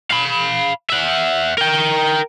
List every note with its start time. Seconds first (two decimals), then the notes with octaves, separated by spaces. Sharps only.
0.11 F5 B5
0.90 E5 F#5
1.58 A#4 G5